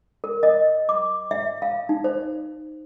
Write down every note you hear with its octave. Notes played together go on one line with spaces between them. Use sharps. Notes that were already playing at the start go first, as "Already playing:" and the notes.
A#4
D#5
D6
E5
F5
D#4
C5